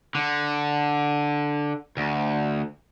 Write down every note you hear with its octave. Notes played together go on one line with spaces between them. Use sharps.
D3
D2